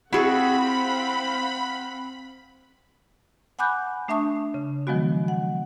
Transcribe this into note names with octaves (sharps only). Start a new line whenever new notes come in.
C4 E4 F#4 G#4 A4 F5 F#5 B5
F#5 G#5 B5 D6 F#6 G6
A3 D4 E5 A5 C#6 D#6
C#3
D#3 F3 F#3 G#3 B3 F#4
F#5